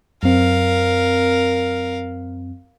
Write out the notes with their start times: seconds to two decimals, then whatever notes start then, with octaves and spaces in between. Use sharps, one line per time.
0.23 F#2 C4 A#4 F5